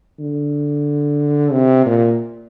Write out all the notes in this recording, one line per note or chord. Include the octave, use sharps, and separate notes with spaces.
D3
C3
A#2